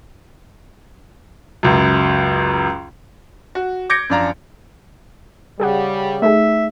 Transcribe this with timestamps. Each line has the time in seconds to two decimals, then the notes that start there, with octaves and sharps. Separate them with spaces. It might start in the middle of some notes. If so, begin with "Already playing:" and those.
1.63 C#2 F#2
3.55 F#4
3.90 D6 G6 G#6 A#6 C#7 D7
4.10 F#2 F3 D4 D5 F5 A#5
5.60 C#3 G3 G4 G#4 F#5
6.22 A3 D#4 G#4 E5